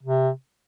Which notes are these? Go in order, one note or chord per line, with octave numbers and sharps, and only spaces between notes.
C3